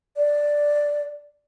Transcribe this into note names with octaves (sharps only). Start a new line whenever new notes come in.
D5